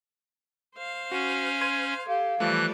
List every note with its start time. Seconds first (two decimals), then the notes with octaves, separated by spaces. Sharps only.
0.76 C5 F5
1.12 C#4 F#4
1.61 C6 G#6 D#7
2.07 G4 A4 F5
2.40 E3 F3 G3 A3 D5 F#6